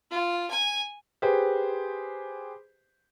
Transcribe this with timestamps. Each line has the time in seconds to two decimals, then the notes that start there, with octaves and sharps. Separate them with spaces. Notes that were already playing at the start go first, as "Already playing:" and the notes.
0.11 F4
0.50 G#5
1.22 G4 G#4 B4 C5